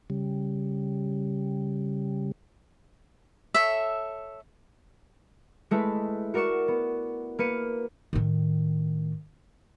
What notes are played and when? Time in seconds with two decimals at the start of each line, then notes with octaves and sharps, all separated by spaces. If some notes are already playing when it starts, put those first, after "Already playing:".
0.10 C#3 G3
3.54 A4 C#5 E5
5.71 G#3 A3 E4 B4
6.34 F#4 A#4 D5 C#6 E7
6.68 B3
7.39 A#3 B4 C#7 D#7
8.13 A2 D#3